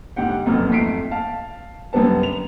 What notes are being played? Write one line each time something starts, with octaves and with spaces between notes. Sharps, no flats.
D2 G#2 G4 F#5 G5
F1 F#2 B2 F6
F2 G#2 A3 B6 C7 D7
F5 A5
F#2 D3 G3 B3 A5
F7